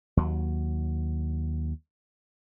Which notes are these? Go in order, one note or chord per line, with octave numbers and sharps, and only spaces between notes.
D#2 F#3